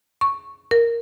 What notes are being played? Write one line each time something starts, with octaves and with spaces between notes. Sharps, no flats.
C#6
A#4